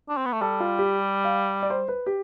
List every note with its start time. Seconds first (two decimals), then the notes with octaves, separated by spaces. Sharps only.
0.09 D4
0.17 C4
0.26 B3
0.33 A3
0.41 G3 A4
0.60 F4
0.79 G4
1.24 F5
1.63 D5
1.70 C5
1.88 B4
2.06 G4